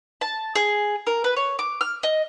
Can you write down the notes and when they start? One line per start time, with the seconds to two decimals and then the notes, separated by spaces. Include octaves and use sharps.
0.21 A5
0.56 G#4
1.07 A#4
1.24 B4
1.36 C#5
1.59 D6
1.81 F6
2.03 D#5